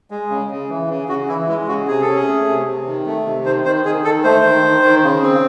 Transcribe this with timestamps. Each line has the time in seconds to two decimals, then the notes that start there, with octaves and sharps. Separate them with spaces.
0.11 G#3
0.30 C#3
0.50 C#3
0.69 E3
0.89 C#3
1.08 C#3 F#4
1.28 E3 E4
1.48 G#3 E4
1.68 C#3 F#4
1.87 C3 G#4
2.02 A4
2.08 C#4
2.16 G#4
2.27 A3
2.47 C3
2.66 C3
2.87 D#3
3.06 A3
3.25 C3
3.45 D#3 C5
3.65 D#3 C5
3.85 D#3 G#4
4.04 D#3 A4
4.24 A3 C5
4.44 D#3
4.64 D#3
4.83 D#3
5.03 C#3
5.23 C4